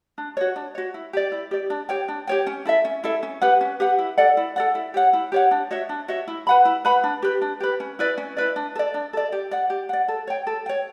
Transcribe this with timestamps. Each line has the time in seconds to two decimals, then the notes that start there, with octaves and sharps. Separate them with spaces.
0.18 D4
0.37 F#4 C#5
0.56 D4
0.75 F#4 C#5
0.94 E4
1.13 G4 D5
1.32 E4
1.51 G4 D5
1.70 D4
1.89 G4 C#5 G5
2.08 D4
2.27 G4 C#5 G5
2.46 C#4
2.65 E4 A4 E5
2.85 C#4
3.04 E4 A4 E5
3.23 C#4
3.42 G4 B4 F#5
3.61 C#4
3.80 G4 B4 F#5
3.98 E4
4.18 A4 D5 F#5
4.37 E4
4.56 A4 D5 F#5
4.75 E4
4.94 G4 C#5 F#5
5.13 E4
5.32 G4 C#5 F#5
5.51 D4
5.71 F#4 C#5 E5
5.89 D4
6.08 F#4 C#5 E5
6.28 E4
6.47 B4 F#5 B5
6.65 E4
6.85 B4 F#5 B5
7.04 D4
7.22 G4 B4
7.41 D4
7.60 G4 B4
7.80 C#4
7.99 E4 B4 D5
8.17 C#4
8.37 E4 B4 D5
8.56 D4
8.75 A4 D5
8.94 D4
9.13 A4 D5
9.32 G4
9.51 D5 F#5
9.70 G4
9.89 D5 F#5
10.08 A4
10.27 C#5 G5
10.47 A4
10.66 C#5 G5